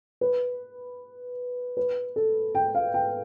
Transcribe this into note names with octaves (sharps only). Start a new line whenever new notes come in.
B4
B4
A4
G5
F5
G5